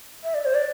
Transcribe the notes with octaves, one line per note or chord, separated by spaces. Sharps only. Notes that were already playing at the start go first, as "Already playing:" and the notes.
E5
D5
C5
D5